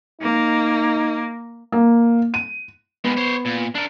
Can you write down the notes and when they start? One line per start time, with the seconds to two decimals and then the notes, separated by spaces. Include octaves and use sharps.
0.21 A#3 D#4
1.72 A#3
2.34 D#7
3.04 G3 G#3 B3
3.17 C5 C#5
3.45 A#2
3.75 D4 A#4